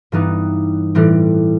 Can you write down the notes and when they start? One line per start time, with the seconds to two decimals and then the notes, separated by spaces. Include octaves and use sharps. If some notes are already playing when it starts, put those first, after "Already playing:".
0.12 G2 E3 G3 B3 D#4
0.95 A2 E3 G3 C4